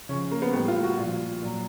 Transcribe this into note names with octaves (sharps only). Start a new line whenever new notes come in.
C#3 F3 C#4
A#3
B3
A2 E3 G3 B3
F4
F#4
A#2 F3 F4
A#2 F#3